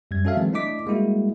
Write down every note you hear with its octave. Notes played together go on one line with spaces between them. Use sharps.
F#2 G3 G#6
C#4 F#4 A4 E5 F5
E3 F#3 G#3 B3 C4
A3 D4 E4 D#5 D6 B6
G3 G#3 A#3 E4 F#4